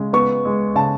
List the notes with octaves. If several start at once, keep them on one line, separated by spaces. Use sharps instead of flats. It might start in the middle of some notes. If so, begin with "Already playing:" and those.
Already playing: C#3 G#3
B3 C#6
G#3
C#3 A5